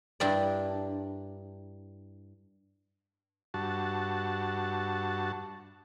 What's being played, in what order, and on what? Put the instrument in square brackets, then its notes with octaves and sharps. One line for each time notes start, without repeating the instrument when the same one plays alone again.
[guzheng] G2 D4 E4 G4 A#4 D5
[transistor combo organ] G2 F#4 A5